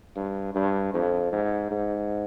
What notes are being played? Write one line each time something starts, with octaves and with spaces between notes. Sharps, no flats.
G2
G2
F2
G#2
G#2